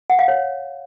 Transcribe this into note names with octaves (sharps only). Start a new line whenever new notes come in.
F#5
F5
C#5